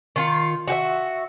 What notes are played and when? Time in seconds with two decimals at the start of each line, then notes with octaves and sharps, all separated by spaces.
0.16 D#3 F4
0.68 F#4 G4 E5